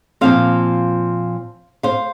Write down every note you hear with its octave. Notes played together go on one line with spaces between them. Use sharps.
A#2 F3 C4 C5 F5
C5 F5